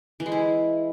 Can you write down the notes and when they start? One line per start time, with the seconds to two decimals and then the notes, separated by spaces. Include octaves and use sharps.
0.20 E3
0.26 G#3
0.32 E4